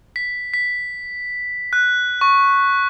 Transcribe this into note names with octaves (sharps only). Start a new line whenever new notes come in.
B6
B6
F#6
C#6